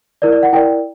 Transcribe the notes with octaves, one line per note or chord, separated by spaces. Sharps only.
E4 A#4 D5
D5
F#5
E4 A#4 D5 G5